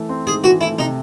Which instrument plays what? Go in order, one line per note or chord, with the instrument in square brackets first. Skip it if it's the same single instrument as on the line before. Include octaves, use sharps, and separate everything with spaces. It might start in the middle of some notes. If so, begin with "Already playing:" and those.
Already playing: [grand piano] E3 A3
C4
[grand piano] G#2 [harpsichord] G#4
[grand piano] E3 [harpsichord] F#4
[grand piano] A3 [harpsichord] E4
[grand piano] C3 [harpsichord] D#4